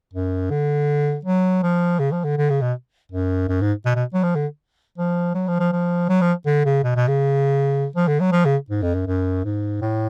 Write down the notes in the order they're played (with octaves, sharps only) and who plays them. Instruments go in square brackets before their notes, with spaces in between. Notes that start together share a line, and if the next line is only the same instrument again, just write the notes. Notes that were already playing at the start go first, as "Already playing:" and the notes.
[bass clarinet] F#2
D3
F#3
F3
C#3
F3
D3
D3
C#3
B2
F#2
F#2
G#2
B2
B2
F#3
F3
D3
F3
F#3
F3
F3
F3
F#3
F3
D3
C#3
B2
B2
C#3
F3
D3
F#3
F3
C#3
G#2
F2
F#2
F#2
G#2
A2